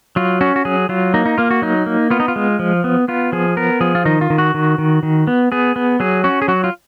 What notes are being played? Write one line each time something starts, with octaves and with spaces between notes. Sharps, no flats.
F#3 F4
C#4 F#4
F#4
F#3 G#4
F#3 F4
A#3 D#4
D#4
A#3 F4
F#4
F#3 D#4
A#3
B3 F4
D#4
F4
G#3
F3
B3
B3 F4
F3 G#4
B3 A#4
F3 G#4
F4
D#3 D#4
F4
D#3
F#4
D#3
D#3
D#3
B3
B3 G#4
B3
F#3 G#4
C#4 F#4
G#4
F#3 F#4
F4